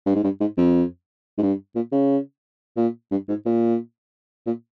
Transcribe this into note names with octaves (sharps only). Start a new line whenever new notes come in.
G2
G#2
G2
G#2
F2
G#2
G2
A#2
C#3
A#2
G2
G#2
A#2
A#2